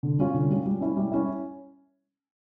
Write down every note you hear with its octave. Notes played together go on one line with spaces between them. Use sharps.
D3
G3 C#4 F4
D3
G3 C#4 F4
G3
C#4 E4
G3
C#4 E4